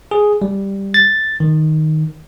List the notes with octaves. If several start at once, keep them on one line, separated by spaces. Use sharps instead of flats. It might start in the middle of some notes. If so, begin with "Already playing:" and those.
G#4
G3
A6
D#3